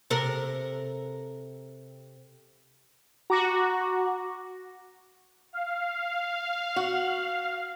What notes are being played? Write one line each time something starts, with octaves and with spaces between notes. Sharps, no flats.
C3 A4 A#4
F#4 A#5 D6 A#6
F5
F#4